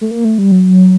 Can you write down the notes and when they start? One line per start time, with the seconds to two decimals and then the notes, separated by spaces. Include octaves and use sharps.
0.01 A3
0.11 A#3
0.25 A3
0.38 G3
0.52 F#3